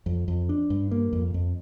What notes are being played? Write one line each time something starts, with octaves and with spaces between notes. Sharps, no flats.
F2
F2
D4
G2
A#3
F2
F2